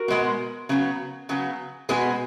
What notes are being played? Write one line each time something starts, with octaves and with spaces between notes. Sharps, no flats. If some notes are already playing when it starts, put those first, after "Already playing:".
Already playing: F#4 A#4
B2 G#3 B3
C#3 F#3 B3
C#3 F#3 B3
B2 G#3 B3 G#4 B4